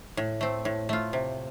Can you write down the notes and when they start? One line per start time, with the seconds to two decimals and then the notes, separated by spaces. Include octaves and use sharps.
0.17 A2
0.41 A3 C4
0.65 A2
0.89 A3 F4
1.13 C3